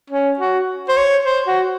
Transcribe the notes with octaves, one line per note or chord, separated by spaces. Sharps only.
C#4
F#4
C5
C#5
C5
F#4